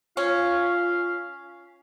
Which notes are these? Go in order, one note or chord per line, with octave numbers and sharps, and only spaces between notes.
C#4 F4 F5